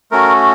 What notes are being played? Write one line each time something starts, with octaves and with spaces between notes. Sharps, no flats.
A3 C#4 F#4 A#4